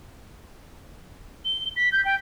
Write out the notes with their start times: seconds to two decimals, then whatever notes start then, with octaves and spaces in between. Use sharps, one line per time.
1.45 G7
1.76 B6
1.92 G6
2.05 G5